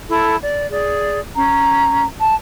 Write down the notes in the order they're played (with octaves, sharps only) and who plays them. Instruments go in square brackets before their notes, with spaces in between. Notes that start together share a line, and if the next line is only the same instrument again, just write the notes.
[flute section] E4 A4
D5
G#4 D5
C#4 A#5
A5